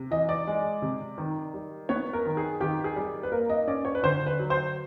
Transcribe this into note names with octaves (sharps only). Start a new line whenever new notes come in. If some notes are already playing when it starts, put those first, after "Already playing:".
Already playing: C3
E3 D#5
D5
G#3
C3
D#3
G3
B3 C#5
A#4
D#3
G#4
D#3 G4
G#4
G3
B4
A#3 A#4
D#5
C#4 D5
C#5
B4
D3 C5
B4
F#3
C5